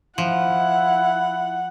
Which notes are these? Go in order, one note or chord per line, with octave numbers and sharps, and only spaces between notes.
F3 E4 F#5